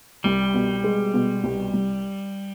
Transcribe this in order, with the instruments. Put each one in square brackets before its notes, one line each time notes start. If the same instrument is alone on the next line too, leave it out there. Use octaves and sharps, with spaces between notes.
[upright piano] C2 [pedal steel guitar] G3
[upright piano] B2
G#3
B2
C2
C2